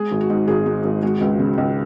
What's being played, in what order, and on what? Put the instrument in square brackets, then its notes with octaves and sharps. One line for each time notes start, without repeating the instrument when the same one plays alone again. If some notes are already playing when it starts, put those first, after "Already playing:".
Already playing: [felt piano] G#3 G#4
G#1
F#4
G#2
G#1 G#4
G#3
G#1
G#3 F#4
C#2
C#3
C#2